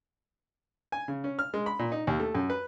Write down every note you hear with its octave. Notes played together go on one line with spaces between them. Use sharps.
G#5
C#3
C#4
F6
G#3
B5
A#2
D#4
D#2
A3
F#2
B4